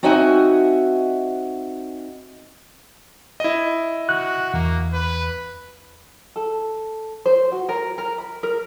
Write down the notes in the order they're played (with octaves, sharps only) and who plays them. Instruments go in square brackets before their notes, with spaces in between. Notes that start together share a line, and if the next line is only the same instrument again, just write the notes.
[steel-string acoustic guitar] C4 D#4 F#4 E5 F#5 G#5
[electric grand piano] E4 D#5
[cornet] F#4 [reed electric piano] F#6
[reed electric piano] E2 [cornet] A#3
[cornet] B4
[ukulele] A4
C5
F#4
A#4
A#4
B5
A#4